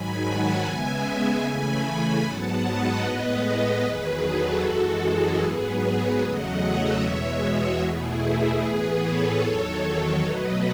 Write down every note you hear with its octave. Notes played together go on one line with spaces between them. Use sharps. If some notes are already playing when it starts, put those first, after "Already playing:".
Already playing: G#2 D#3 F#3 G#5 B5
F#5 A5
C#3 G#3 B3 E5 G#5
C#3 E3 A3 G#5 B5
G#2 F#3 B3 F#5 A5
B4 D#5
A2 G#3 B3 B4 D#5
E2 D#3 F#3 G#4 B4
F#4 A4
F#2 E3 G#3
E4 G#4
G#2 F#3 B3 G#4 B4
G#4 B4
E2 C#3 F#3 A3 D#5 F#5
C#5 E5
E2 B2 G#3 B3
F#4
E2 B2 A3 E4 G#4
A2 E3 B3 G#4 B4
A4 C#5
E2 D#3 F#3
B2 F#3 A3 B4 D#5